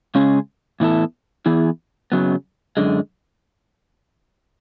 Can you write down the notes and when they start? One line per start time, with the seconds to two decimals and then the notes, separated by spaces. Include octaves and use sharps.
0.15 C#3 G#3 C#4 G#4
0.80 A2 E3 B3 E4 A4
1.46 E3 B3 E4 G#4
2.12 F#2 C#3 F#3 B3
2.77 F#2 D3 G#3